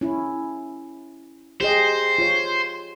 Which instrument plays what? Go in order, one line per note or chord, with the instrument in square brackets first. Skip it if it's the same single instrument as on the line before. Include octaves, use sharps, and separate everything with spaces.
[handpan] C#4 E4
[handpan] G4 G#4 D#5 [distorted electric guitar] C5
[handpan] F4 C#5